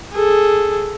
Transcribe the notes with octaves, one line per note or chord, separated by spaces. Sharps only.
G#4 A4